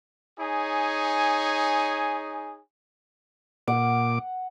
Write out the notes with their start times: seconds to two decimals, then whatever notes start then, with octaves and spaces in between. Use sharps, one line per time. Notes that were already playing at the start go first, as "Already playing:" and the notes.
0.40 D#4 G#4 C#5 G#5
3.68 A#2 F#5 D6